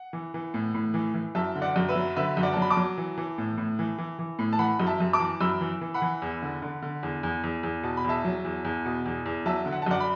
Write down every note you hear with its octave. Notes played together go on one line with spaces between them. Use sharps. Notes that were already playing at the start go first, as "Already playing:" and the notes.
Already playing: F#5
E3
E3
A2
A2
E3
E3
F#2 E5 A5
D3
D5 F#5
F#2
B4 E5
F#3
D3 B4 E5
F#2
D5 F#5
F#3 A5
B5
A5 D6
F#3
E3
E3
A2
A2
E3
E3
E3
A2
A5
E3 F#5 B5
F#2
E5 A5
F#2
A5 D6
E3
F#2 B5 E6
E3
E3
F#5 B5
E3
E2
D3
D3
D3
E2
E2
E2
E2
B2 A5
B5
E2 E5 A5
F#3
E2
E2
B2
E2
E2
F#3 E5 A5
D3
F#5
A5
F#2 D5 F#5
B5